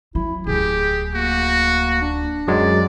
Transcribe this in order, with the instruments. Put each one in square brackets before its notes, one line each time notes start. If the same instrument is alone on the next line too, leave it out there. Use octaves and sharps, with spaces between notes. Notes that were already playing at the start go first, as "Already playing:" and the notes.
[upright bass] F#3 [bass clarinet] E4
[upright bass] D1 A3 [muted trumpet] G4 [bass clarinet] G#4
[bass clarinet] A#3 [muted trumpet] F#4
[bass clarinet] D4
[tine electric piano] F#2 F#3 G#3 [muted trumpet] D5